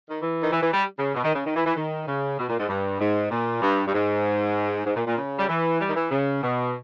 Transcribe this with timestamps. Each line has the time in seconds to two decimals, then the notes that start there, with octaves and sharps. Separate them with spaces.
0.09 D#3
0.22 E3
0.43 D#3
0.52 E3
0.63 E3
0.73 G3
0.99 C#3
1.15 B2
1.24 D#3
1.35 C#3
1.45 D#3
1.55 E3
1.66 E3
1.76 D#3
2.07 C#3
2.39 B2
2.49 A#2
2.58 G#2
2.69 G2
3.00 G#2
3.31 A#2
3.62 G2
3.87 G2
3.94 G#2
4.86 G#2
4.96 A#2
5.06 A#2
5.17 C#3
5.39 G3
5.48 E3
5.80 G3
5.88 D#3
5.95 E3
6.11 C#3
6.42 B2